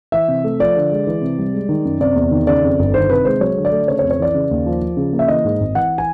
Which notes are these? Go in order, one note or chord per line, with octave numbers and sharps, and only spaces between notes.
E3 E5
C3
A3
F3 D5
D3
G#3
E3
C3
G3
G#3
D#3
F#2
C3 D5
E2
D#3
C#3 D5
F2
G1
D#3 C5
C3 B4
G#3 C5
F#3 C#5
D3
D5
A3
C#3 C#5
C#5
F2
C#5
E3 D5
C#3
D#2
F3
F3
C#3
A#3
E5
E3 D#5
G#2
G#1
E3 F#5
G#5